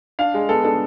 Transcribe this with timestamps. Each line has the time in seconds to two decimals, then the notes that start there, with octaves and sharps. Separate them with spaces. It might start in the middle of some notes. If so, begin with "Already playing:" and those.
0.19 D4 F5
0.34 G#3
0.49 B3 A4
0.64 D4 A4